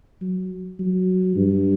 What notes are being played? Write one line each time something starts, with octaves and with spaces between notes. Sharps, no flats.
F#3
F#3
G2